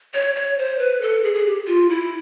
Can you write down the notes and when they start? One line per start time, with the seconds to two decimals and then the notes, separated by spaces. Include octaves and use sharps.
0.14 C#5
0.36 C#5
0.58 C5
0.79 B4
1.02 A4
1.24 G#4
1.34 G#4
1.46 G4
1.67 F4
1.90 E4